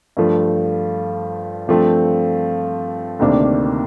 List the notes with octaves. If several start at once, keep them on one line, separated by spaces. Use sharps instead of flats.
G2 F3 A3
G2 F3 A3 C4
D2 C3 D#3 A#3 D4